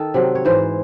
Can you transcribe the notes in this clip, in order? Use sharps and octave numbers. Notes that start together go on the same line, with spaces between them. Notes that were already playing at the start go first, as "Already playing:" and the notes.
Already playing: D#3 A4
C3 F#3
C#5
G#2 E3 C5